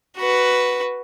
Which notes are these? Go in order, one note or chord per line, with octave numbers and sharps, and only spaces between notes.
F#4 B4